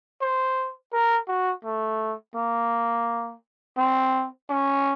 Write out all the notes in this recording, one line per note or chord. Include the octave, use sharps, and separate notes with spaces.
C5
A#4
F#4
A3
A#3
C4
C#4